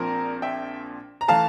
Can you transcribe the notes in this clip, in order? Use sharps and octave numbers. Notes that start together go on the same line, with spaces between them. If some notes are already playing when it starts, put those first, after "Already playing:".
Already playing: A#1 A#2 F3 C4 A#4
E5 G5
A#5
E3 A3 F5 A5